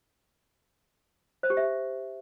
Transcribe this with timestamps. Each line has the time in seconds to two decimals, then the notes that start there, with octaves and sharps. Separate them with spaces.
1.43 C5
1.50 G4
1.57 E5